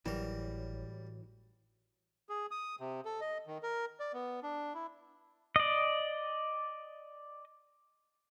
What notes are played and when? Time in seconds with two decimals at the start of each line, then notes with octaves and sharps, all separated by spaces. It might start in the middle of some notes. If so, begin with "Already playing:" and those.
0.06 G#1 A2 E3 F#3 G3 A#4
2.29 G#4
2.51 D#6
2.80 C3
3.05 A4
3.21 D#5
3.47 D#3
3.63 A#4
4.00 D5
4.13 B3
4.43 D4
4.75 E4
5.56 D5 D#5